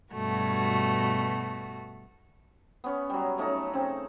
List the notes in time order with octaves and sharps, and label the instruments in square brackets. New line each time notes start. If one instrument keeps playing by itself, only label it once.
[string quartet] G2 B2 A3 F#4
[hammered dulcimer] B3 C#4 C#5
F#3 G3
A3 C#4 D#4 A4
C#3 C4